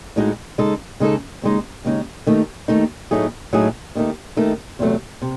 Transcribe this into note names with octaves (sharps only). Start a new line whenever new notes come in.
A2 G#3 D#4 F#4
C#3 G#3 D#4 A4
C#3 G#3 D#4 A4
D#2 C#3 G#3 D#4
D#2 C#3 G#3 D#4
D#2 D#3 A3 D#4
D#2 D#3 A3 D#4
A2 F#3 A3 D#4 G#4
A2 F#3 A3 D#4 G#4
D#2 D#3 A3 D#4
D#2 D#3 A3 D#4
E2 C3 F#3 A3
C3